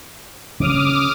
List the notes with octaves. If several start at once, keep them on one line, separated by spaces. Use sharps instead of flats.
C#3 D6 D#6 F6